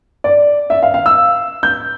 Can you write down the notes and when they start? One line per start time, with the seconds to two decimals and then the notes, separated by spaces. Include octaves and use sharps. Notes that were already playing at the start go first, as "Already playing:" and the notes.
0.24 D5
0.70 E5
0.83 F5
0.94 F5
1.06 E6
1.63 G6